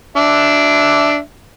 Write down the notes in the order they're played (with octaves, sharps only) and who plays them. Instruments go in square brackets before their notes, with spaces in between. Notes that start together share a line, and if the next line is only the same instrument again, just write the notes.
[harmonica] D4 E5